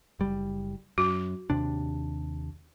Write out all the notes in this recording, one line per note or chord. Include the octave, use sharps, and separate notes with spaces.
F#1 G3
F#2 F#4
D#2 C3 D4